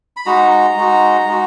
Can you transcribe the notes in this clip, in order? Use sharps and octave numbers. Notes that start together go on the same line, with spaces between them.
B5
G#3 D#4 F#4 A#5
A#5
G#3 D#4 F#4
G#3 D#4 F#4